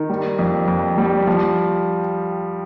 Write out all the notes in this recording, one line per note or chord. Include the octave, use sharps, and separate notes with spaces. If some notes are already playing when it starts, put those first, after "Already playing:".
Already playing: D#3
G3
F2
F2
G3
F3